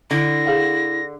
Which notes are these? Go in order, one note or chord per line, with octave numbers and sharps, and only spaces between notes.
D3 E4 A#6
G#4 F5 F#5